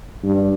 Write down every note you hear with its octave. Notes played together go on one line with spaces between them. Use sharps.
G2